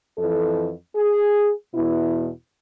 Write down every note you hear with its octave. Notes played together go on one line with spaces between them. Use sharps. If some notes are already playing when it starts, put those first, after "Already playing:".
F2 E3 A4
G#4
E2 B2 E4